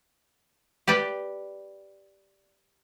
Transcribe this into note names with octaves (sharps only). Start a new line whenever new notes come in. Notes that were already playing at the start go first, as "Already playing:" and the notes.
G4 B4 D5 G5